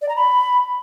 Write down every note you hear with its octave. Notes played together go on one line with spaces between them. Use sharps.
D5
A#5
B5